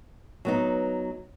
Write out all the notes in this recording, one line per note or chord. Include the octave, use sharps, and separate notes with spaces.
F#3 B3 D#4